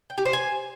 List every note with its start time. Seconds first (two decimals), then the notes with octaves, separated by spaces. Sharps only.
0.10 G5
0.18 G4
0.25 C5
0.33 G#5